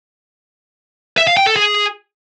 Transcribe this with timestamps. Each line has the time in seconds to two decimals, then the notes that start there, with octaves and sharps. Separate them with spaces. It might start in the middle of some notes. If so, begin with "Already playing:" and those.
1.18 E5
1.27 F5
1.37 G5
1.47 A4
1.56 G#4